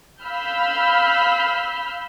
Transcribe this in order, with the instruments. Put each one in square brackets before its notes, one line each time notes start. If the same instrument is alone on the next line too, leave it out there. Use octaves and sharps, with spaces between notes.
[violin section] F5 B5 E6 F6 G6